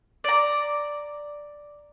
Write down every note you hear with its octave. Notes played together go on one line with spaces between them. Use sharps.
D5 A#5